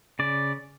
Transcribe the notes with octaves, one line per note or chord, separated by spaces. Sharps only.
C#3 D5